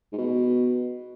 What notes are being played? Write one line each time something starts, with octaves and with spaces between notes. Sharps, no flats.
G#2
B2